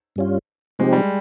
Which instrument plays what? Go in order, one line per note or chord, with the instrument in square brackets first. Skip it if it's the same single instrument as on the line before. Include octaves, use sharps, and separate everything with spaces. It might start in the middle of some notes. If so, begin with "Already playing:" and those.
[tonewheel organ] G2 G3 C#4 F4
[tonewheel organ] C3 F3 C4 D#4 G4 [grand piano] G#3
[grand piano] G3